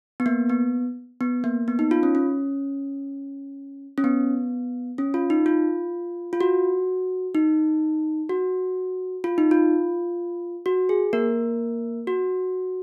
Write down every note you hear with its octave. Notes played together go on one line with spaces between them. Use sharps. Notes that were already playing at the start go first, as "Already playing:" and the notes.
B3
A#3
B3
B3
A#3
B3
D#4
F4
C#4
C#4
C#4
B3
C#4
F4
D#4
F4
F4
F#4
D#4
F#4
F4
D#4
F4
F#4
G#4
A#3 A#4
F#4